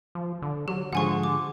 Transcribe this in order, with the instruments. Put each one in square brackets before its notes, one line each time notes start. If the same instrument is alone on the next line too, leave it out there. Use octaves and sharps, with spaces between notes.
[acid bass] F3
D3
[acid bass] F#3 [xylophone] G4
[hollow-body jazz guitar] G#2 D3 G#3 [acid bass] F3 [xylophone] F#5 G#5 C#6
[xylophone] D6